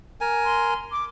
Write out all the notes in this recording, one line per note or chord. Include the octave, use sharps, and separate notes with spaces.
A#4 G#5
C6
D6